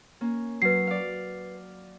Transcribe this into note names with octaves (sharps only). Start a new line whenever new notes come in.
A#3 C#4
F#3 B4 C7
D5 F5